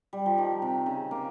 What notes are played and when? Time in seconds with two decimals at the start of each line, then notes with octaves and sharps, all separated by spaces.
0.13 G3
0.26 F3
0.38 D#3
0.62 C3
0.86 C#3
1.11 A#3